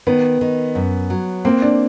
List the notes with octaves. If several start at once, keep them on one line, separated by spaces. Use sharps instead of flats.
D#3 B3
D#3
F#2
F#3
A#3 C4
D4